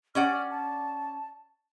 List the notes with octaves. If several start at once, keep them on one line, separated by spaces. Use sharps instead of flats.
C#4 D5 F#5 F6
A5